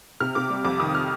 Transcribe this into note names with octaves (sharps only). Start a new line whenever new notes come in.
C3 F6
C3 D6
G3
F2 D6
D#3 D#6
F6